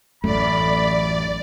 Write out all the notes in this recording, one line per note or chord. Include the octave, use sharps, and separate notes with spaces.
A1 F#2 A3 D5 B5